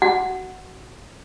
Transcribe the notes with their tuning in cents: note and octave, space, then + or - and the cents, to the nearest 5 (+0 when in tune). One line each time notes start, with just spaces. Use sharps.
F#4 +15 F#5 +0